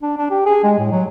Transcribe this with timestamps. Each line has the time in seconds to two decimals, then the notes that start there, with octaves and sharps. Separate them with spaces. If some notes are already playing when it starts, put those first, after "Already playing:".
0.03 D4
0.18 D4
0.31 G4
0.46 G#4
0.64 G#3
0.79 A2
0.92 F#3